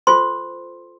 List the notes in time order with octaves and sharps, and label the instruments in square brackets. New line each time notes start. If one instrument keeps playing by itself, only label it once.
[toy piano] F4 A4 C5 C6